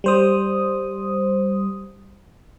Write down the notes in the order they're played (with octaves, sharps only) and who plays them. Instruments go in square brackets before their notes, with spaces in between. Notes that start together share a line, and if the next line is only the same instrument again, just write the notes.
[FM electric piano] G3 C5 D#6